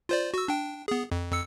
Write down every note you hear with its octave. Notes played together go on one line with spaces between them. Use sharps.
F4 C5 D5
F#4 E6
D4 G5
B3 G#4
F2
F2 E6 C#7